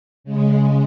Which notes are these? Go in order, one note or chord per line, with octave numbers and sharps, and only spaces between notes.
C#3 G#3